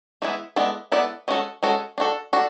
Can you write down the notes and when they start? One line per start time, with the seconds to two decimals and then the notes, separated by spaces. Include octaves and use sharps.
0.22 E3 G#3 B3 E4
0.56 G#3 B3 E4 A4 D5
0.92 G#3 B3 E4 A4 D5
1.28 G#3 C#4 F#4 A4
1.63 G#3 C#4 F#4 A4
1.98 D4 F#4 A4
2.33 D4 F#4 A4